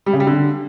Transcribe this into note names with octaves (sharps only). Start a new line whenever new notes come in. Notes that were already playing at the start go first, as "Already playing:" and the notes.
G3
C#3
G3
D3